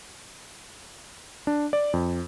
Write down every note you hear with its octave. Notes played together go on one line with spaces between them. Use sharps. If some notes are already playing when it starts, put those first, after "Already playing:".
D4
D5
F2